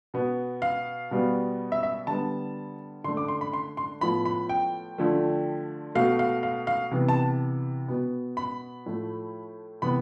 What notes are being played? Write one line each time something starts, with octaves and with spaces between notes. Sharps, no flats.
B2 B3
F5
B2 G3 B3
E5
E5
D3 G3 B3 A5
D3 A3 C6
D6
C6
B5
C6
C6
A2 F3 B3 B5
B5
G5
D3 F3 A3
B2 A3 F5
F5
F5
F5
C3 E3 B3
A5
B2 B3
B5
A2 F3 A3
C3 E3 B3 B5